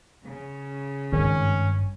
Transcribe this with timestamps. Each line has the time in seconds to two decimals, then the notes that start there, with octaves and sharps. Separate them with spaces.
0.22 C#3
1.12 G#1 G2 C#4